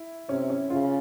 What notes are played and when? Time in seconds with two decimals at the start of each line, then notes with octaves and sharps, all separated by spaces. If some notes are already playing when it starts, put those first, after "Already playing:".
Already playing: E4
0.29 C3 C#4
0.50 C#4
0.70 C#3 F4